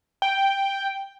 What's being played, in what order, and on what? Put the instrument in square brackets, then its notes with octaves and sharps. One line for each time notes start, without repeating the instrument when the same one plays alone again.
[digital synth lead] G5